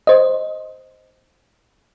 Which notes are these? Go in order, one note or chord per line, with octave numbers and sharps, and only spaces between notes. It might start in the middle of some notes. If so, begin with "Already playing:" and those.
C5 D#5